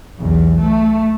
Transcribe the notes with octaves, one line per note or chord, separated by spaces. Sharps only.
B1 E2
A3